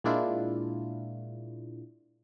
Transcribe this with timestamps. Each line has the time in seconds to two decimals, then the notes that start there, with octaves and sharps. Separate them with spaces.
0.04 A#2 G#3 A#3 D4 E4 F4